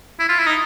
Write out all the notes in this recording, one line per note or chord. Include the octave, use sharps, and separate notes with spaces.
E4
F4
E4
D#4